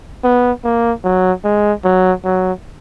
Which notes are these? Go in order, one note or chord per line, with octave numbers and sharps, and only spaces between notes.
B3
A#3
F#3
G#3
F#3
F#3